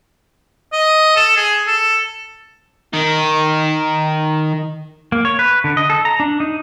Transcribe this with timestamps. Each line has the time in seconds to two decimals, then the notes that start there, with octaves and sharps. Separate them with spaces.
0.72 D#5
1.16 A4
1.36 G#4
1.67 A4
2.93 D#3 D#4
5.12 A#3
5.25 C#5
5.39 B4
5.64 D3
5.77 D#5
5.90 A4
6.05 A#5
6.20 D4
6.40 D#4